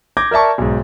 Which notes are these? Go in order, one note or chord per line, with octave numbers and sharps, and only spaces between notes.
D6 G6 G#6 A#6
A#4 D5 E5 A5 C#6
B1 G#2